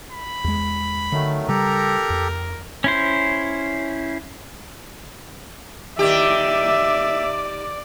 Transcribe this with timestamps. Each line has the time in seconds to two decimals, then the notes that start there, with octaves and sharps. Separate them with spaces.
0.11 B5
0.44 E2 G#3
1.12 D3 D#3 F#3 A3
1.48 C#3 G3 G4 A4 A#4 A#5
2.10 F2
2.84 C#4 E4 C5
5.99 D#3 G4 D5 E5 D6